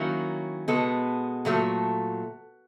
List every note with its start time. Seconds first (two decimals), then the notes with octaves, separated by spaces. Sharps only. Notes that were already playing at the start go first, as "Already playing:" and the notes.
Already playing: D#3 F#3 A#3 C#4 E4
0.68 B2 G#3 B3 A4
1.45 A#2 F#3 A3